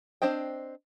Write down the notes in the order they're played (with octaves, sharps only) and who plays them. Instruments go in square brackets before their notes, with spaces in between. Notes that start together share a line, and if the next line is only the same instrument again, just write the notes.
[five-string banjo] C4 D4 C5 D#5 G5